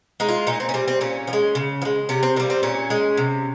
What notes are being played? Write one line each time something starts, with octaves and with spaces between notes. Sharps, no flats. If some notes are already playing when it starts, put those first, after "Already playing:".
G#3 D#4
F4
A#2 D#4
C4
C#4
G3 C4
C4
A#2 C#4
F3
G#3
C#3
F3
G#3
C3 C#4
C4
D#3 G3 A#3
C4
A#2 C#4
G#3
C3